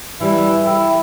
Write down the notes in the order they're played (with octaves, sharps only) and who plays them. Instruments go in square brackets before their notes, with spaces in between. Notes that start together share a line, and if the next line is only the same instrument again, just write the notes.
[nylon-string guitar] E3 G3 [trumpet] E4
[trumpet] E4 [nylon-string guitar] A4 G5